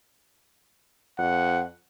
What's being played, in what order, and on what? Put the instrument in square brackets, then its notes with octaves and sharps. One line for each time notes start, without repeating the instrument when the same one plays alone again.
[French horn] F2 [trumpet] F#5